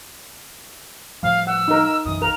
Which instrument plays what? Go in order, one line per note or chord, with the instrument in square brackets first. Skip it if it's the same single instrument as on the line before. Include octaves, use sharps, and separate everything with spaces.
[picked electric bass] A2 F3 G3 [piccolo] F5
[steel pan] F#5 [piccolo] E6
[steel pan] D#4 A#4
[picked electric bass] B1 F#2 E3 [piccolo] D#6
[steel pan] A#4 [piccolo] F7